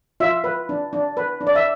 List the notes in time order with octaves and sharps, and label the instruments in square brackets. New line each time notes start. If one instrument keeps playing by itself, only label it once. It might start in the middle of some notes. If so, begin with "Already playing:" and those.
[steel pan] F4 E5
B4
D4
D4
B4
D4
D5
E5